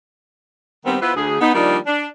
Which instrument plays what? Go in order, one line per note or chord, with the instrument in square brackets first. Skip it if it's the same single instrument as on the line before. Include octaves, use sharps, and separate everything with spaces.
[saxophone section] D#3 G3 B3 C4
B3 E4 F4 B4 C5
D2 G#4
B3 D#4
D#3 F3 G3 A#3 D4 D#4
D4